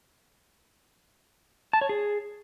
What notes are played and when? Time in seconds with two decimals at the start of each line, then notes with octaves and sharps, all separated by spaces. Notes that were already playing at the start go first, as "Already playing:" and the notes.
1.73 A5
1.81 C#5
1.89 G#4